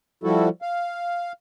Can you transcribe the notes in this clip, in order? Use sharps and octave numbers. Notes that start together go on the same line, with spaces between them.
F3 G3 E4 F#4 A4
F5